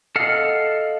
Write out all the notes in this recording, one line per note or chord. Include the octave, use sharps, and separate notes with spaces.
A4 D#5 F5 F#5 F6